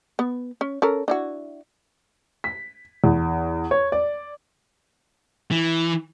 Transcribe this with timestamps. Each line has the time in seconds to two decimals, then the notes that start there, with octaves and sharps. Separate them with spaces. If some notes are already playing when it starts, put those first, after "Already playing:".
0.19 B3
0.61 C#4
0.82 C#4 A4 A#4
1.08 D4 E4 F#4
2.44 B6
3.04 E2
3.71 C#5
3.92 D5
5.51 E3